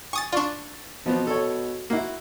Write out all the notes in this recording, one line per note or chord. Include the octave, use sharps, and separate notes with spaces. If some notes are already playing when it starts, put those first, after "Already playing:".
G#5 C#6 D#6 A6
D4 F4 D5 C#6
B2 F3 B3 C4
A4 C#5
A#3 E4 F#4